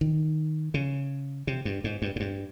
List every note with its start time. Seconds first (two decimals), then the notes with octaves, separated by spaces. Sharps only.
0.01 D#3
0.74 C#3
1.47 C3
1.65 G2
1.84 G#2
2.02 G2
2.16 G#2
2.20 G2